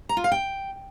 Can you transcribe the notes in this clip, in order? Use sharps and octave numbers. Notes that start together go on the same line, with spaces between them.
A#5
F4
F5
G5